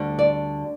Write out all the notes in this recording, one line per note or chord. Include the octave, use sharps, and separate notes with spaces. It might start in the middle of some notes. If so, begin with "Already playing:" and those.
Already playing: D2 D3 G3
D5